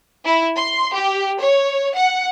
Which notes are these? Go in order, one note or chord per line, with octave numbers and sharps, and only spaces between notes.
E4
C6
G4
C#5
F#5